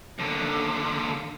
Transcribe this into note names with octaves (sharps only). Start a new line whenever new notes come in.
D#2 D3